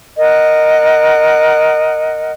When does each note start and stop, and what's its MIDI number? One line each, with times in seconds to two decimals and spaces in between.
0.18 2.32 70
0.18 2.32 75
0.18 2.32 78